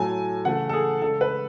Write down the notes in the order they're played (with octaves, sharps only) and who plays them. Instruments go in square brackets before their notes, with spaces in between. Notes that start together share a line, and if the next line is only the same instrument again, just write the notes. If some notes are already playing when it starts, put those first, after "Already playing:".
Already playing: [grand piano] A2 F#3 A3 G#5
C#3 E3 A3 F#5
A4
G#4
C#3 G#3 A4
B4